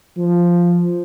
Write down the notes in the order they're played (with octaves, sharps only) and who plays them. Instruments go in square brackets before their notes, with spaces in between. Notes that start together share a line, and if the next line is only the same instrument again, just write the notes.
[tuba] F3